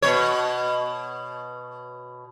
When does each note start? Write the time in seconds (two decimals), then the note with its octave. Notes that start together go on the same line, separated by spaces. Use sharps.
0.02 B2 C#5